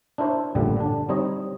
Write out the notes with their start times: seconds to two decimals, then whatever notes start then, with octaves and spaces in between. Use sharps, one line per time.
0.18 D4 E4 A#4 C5 C#5
0.55 A1 G2 A#2 D3 G3
0.76 D3 D4
1.09 G3 C4 D#4 C#5 D#5